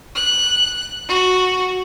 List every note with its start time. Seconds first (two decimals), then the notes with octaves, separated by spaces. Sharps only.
0.15 F#6
1.08 F#4